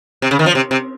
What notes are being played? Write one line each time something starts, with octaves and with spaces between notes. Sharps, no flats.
C3
C#3
D#3
F3
C3
C3